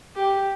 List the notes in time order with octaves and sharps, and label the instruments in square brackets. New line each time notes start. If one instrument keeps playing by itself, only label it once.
[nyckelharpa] G4